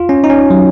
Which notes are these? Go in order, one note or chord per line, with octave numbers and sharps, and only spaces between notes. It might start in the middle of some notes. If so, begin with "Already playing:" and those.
Already playing: F4
C#4
D#4
C#4
F#3